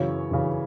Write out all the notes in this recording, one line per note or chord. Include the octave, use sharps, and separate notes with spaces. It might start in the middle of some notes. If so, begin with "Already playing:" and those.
Already playing: F#2 C#3 E3 C#5
F#2 C#3 E3